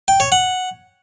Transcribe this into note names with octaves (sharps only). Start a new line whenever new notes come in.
G5
C#5
F#5